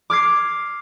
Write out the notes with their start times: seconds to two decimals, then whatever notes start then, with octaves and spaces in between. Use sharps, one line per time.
0.10 D6 F6 G#6 C7